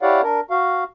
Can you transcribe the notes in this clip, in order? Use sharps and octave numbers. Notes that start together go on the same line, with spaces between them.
E4 G4 C#5 D5 F5 F#5
D4 A#4
F#4 F5